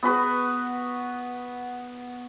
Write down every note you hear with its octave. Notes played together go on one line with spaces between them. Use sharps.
B3 F#4 B4